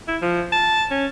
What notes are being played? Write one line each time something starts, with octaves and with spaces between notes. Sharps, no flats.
E4
F3
A5
C#4